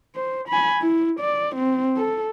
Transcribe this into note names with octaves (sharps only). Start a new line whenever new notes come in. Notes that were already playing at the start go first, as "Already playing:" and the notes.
C5
G#5 B5
E4
D5
C4
A4